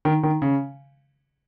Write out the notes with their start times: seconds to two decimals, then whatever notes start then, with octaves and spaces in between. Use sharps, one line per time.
0.05 D#3
0.23 D#3
0.42 C#3